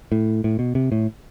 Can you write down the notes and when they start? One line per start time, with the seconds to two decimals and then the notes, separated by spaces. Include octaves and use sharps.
0.12 A2
0.44 A2
0.59 B2
0.75 C3
0.92 A2